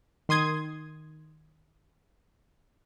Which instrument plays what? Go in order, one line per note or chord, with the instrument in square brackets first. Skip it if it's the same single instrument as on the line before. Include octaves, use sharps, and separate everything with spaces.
[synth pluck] D#3 C6 D#6 G#6